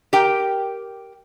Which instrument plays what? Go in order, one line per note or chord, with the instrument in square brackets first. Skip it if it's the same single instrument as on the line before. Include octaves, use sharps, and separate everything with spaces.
[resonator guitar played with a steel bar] G4 A#4 G5